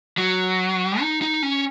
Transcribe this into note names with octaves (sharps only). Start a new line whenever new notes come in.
F#3
D#4
D#4
C#4